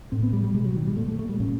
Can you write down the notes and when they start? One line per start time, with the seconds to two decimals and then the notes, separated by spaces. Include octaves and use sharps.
0.12 A2 C4
0.23 B3
0.33 G3
0.44 G3
0.54 B2 G#3
0.65 F#3
0.76 D#3
0.87 G3
0.97 A#2 A3
1.08 A3
1.19 A3
1.29 G3
1.40 A#2 C#4